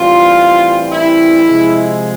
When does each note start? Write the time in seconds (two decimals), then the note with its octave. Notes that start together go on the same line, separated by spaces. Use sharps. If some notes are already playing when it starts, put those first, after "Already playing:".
Already playing: A1 G2 E3 G3 C4 F4
0.91 E4
1.44 C3 F3 G#3